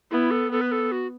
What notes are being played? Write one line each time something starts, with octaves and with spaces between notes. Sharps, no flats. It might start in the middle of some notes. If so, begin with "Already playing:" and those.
B3 E4
A4
B3 A4
B4
A4
F#4